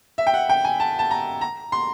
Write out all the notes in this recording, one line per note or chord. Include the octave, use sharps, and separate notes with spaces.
E5
G5
F#5
G5
G#5
A5
A5
A#5
A#5
C6